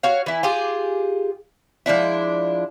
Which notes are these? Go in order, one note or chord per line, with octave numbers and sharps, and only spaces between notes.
F#4 C#5 F5
E3 E4
F4 G4 G#4
F3 G#3 D4 E4